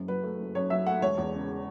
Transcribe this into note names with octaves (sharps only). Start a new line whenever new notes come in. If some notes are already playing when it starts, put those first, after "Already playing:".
Already playing: F#1 F#2
F#3 B4
A3
F#1
F#2 C#5
F#3 E5
A3 F#5
E1 C#5
E2
C#3